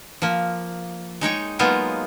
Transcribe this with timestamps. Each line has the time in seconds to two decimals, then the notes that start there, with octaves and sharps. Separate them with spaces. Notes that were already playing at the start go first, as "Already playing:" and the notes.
0.22 F3 A#3
1.21 G#3 D#4 C#5 G5
1.59 F#3 G#3 A#3 B3 D#4 F4